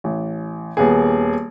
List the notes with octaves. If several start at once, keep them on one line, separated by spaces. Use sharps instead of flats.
A1
D#1 B3 G#4